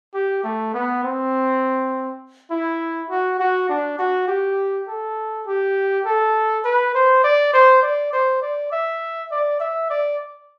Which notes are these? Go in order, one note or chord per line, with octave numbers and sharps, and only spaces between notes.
G4
A3
B3
C4
E4
F#4
F#4
D4
F#4
G4
A4
G4
A4
B4
C5
D5
C5
D5
C5
D5
E5
D5
E5
D5